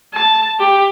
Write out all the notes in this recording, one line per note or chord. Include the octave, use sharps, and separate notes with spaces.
A5
G4